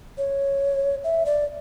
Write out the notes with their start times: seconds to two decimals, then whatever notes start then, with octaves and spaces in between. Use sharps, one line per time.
0.18 C#5
1.04 E5
1.26 D5